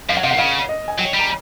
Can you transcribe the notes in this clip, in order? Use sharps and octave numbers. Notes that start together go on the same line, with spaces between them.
F#2 F5
F#5
C3 F5
F#5
C#3 F5
D#5
G#5
F#3 G5
G3
A#5